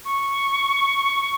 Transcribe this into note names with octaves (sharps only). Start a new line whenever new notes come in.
C#6